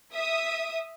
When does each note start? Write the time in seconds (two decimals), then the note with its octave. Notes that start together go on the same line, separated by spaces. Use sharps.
0.12 E5 D#6